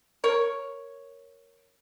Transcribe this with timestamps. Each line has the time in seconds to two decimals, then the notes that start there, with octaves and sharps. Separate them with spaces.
0.24 A#4 C#5